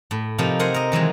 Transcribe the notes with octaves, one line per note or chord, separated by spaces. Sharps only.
A2
C3 F3 D#4 A#4
A#4 C5 F#5 G#5
A#4 D#5
D#3 E3 F#3 G#3